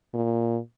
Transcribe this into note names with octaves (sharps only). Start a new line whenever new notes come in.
A#2